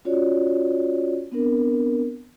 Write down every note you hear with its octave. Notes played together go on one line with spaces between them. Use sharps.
C#4 F4 F#4 C#5 D5
B3 C4 D4 A#4